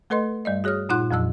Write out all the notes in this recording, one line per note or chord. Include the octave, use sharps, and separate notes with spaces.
A3 A4 B4 D#5 C6
G2 G3 D5 D#5
F#4 G#4 C#5 D#6 F6
A#2 D#4 F4 F#5 C6 F#6
F2 A#2 F3 F#3 A5 E6